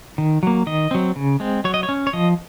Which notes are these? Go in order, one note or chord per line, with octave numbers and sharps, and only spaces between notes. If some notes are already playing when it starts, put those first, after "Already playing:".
D#3
F#3 A#3
D#3 D#5
F#3 C4
C#3
G#3 C4
F#3 C#5
D#5
C#5
C#4
C#5
F3 D#5